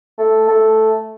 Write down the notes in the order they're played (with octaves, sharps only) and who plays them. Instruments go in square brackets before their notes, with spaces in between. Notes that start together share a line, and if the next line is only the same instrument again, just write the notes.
[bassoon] A3
A3